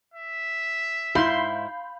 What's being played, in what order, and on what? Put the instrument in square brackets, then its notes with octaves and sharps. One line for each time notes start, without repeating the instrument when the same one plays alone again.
[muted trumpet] E5
[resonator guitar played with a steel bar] G#2 E4 [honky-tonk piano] F5 B5 G6 [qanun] C6